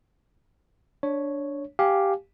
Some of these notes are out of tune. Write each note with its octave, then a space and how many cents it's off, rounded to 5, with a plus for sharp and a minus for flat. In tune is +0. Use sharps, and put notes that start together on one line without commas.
D4 -10 C#5 +0
G4 +0 F5 +0 G#5 +10